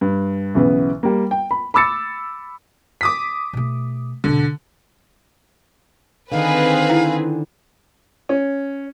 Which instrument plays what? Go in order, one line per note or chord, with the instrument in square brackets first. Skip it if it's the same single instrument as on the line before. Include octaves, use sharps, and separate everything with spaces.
[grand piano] G2
B1 C#3 E3 B3
G3 A#3
G5
B5
B5 D6 E6 A6 C#7
[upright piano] D6 D#6 B6
[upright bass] B2 A3
[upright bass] E2 B2 [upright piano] D3
[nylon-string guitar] D3 D#3 D#4 [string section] C4 G#4 B4 [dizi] F5
[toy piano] E4 G5 A#5
[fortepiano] C#4